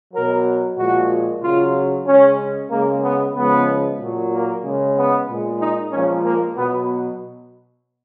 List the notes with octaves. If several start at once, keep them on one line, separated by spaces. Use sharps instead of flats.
B2 F#3 A#4
A#2 F3 G#3 F#4
C#3 F#3 F4
C#3 G#3 C#4
C#3 G#3 A#3
B3
C#3 F3 G#3 B3
A#2 F#3
A#3
C#3 G#3
B3
A#2 G#3
D#4
A#2 F3 G#3 C#4
A#3
B2 F#3 B3